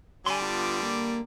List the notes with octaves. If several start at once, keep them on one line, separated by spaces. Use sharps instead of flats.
D3 G3 G#5 B5 C6 D6
B3 F4 A5
A#3